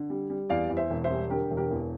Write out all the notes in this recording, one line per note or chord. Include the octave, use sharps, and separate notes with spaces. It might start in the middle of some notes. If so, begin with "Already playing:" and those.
Already playing: D3
G3
G3
E2 D5 F5
E2
C5 E5
E1
C5 E5
G3
D3 G4 A#4
E1
G4 A#4
E2